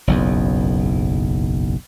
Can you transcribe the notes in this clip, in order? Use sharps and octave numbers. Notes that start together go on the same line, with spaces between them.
F#1 B1 E2